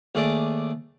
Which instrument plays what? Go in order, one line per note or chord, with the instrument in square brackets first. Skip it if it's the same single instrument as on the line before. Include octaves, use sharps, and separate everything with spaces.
[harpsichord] D#2 A3 G#4 A4 D5 D6